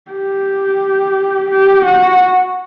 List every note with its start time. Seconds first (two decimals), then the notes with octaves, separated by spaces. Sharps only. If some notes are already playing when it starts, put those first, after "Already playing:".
0.11 G4
1.51 G4
1.85 F#4